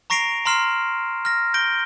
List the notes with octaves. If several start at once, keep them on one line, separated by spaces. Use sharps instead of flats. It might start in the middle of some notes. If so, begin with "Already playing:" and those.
A#5 C#6 A#6 C7 D7 F7
A#5 C6 F6 C7 E7
F6 A#6
G6 A#6 D7 G7